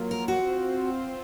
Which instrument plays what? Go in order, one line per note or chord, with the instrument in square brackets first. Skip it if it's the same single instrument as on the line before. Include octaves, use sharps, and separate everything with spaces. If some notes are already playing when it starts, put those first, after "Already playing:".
Already playing: [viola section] F#3 A#3 F4
[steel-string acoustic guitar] A#4
F#4
[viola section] C4 F4 C5